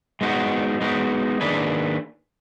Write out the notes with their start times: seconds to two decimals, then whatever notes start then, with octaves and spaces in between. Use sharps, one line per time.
0.21 G#3 B3 D#4 F#4
0.81 G#3 B3 D#4 F#4
1.41 D#3 A#3 D4 G#4 B4